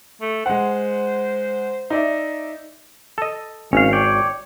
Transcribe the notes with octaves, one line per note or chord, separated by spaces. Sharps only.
A3
G#3 C5 F#5
D#4 D5 E5
A4 D#5
G#1 C#4 F5
C#5 D5 G5